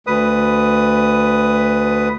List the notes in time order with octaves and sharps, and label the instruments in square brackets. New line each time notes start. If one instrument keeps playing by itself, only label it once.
[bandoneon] D2 B4 D#6